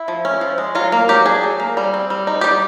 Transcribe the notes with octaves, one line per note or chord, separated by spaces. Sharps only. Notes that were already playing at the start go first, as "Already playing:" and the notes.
Already playing: E4
F3
C#4
F3
G#3
F#3 F4
A#3
F#3 G4
D4 G#4
F#3
A#3
G3
C4
G3
D#4
G3 G4